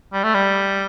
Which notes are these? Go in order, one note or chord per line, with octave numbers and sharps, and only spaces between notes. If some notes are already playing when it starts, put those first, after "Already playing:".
G3
A3
G3